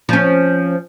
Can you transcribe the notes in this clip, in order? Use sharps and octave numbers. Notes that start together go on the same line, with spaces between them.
F3 C#4